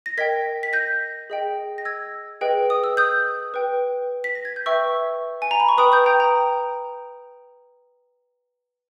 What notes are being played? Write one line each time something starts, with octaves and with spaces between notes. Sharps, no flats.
A#6
A#4 D#5 G5 G#6 B6
B6
G6 A#6
G#4 D#5 G5
A#6
E6 G#6
G#4 B4 D#5 G5
D#6
E6
D#6 G6
B4 G5
B6
A#6
G#6
G6
B4 E5 G5 C#6 E6
G#5
A#5
B5
C#6
B4 G5 B5 D#6
D#6 G6
G5 A#5
G5 A#5